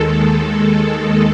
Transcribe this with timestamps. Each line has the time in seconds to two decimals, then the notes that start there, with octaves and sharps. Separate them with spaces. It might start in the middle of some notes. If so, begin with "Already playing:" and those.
Already playing: D#2 D#3 G#3 A4